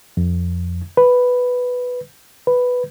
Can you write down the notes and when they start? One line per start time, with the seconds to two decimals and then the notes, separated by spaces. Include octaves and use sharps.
0.17 F2
0.97 B4
2.47 B4